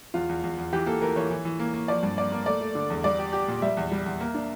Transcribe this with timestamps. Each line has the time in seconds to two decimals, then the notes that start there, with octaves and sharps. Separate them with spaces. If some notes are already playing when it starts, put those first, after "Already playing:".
0.14 E2 F4
0.29 E2
0.43 E2
0.58 E2
0.73 E3 G4
0.86 A#3 A4
1.01 E3 A#4
1.16 E3 C#5
1.30 E3
1.45 E3
1.59 A#3
1.74 A#3
1.88 F3 D5
2.03 G2
2.17 A#3 D5
2.32 A#3
2.46 A3 D5
2.61 A3
2.75 D3
2.90 E2
3.04 G3 D5
3.19 G4
3.33 G4
3.48 A#2
3.62 G3 E5
3.77 E2
3.91 G3
4.06 E2
4.21 A#3
4.35 D4